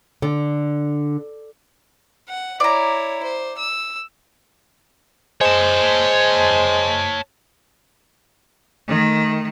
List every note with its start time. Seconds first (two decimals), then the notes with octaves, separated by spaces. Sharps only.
0.22 D3
2.28 F#5
2.60 E4 C#5 D5 A#5
3.23 C5
3.58 E6
5.41 G#3 C5 C#5 A5
8.88 D#3 A3